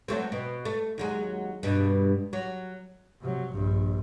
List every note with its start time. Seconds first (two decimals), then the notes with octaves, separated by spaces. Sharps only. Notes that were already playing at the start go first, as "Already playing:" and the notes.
0.08 F#3 A3 C4
0.32 B2
0.65 A3
0.98 D#2 F#3 G#3
1.63 G2 B2
2.33 F#3
3.21 C3 F#3
3.52 A#1 G2